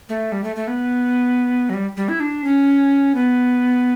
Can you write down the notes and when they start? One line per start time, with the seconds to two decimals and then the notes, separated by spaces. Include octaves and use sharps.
0.09 A3
0.32 G3
0.44 A3
0.56 A3
0.68 B3
1.70 F#3
1.74 G3
1.97 G3
2.09 E4
2.20 D4
2.44 C#4
3.15 B3